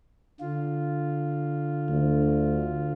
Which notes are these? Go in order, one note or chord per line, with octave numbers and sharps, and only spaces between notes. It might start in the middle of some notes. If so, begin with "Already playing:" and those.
D3 F4
D2